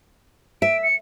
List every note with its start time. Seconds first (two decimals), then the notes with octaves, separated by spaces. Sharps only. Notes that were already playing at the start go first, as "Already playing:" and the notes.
0.62 E5 D7
0.83 C#7